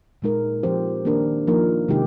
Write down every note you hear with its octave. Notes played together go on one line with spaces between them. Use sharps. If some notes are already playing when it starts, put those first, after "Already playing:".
A#2 G#3 D#4 A#4
F3 C4 G4 C5
D#3 A#3 D4 G4 A#4
F3 A#3 D#4 A#4
C3 D#3 G#3 D#4 G4